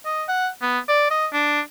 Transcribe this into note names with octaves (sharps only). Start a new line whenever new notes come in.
D#5
F#5
B3
D5
D#5
D4